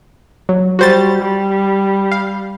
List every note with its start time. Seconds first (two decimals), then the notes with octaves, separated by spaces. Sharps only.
0.49 F#3
0.79 G3 F#4 C5 A6
1.22 G3
2.12 F5